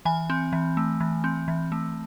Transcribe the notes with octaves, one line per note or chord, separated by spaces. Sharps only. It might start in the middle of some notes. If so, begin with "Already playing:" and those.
E3 G#5
C4
E3
A3
E3
C4
E3
A3